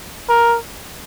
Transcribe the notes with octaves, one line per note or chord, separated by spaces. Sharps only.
A#4